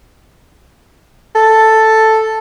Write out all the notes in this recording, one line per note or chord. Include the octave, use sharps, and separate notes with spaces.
A4